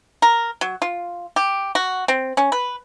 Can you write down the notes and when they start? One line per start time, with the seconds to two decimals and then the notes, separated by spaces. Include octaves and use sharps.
0.22 A#4
0.61 F#3
0.82 F4
1.36 G4
1.75 F#4
2.08 C4
2.37 C#4
2.52 B4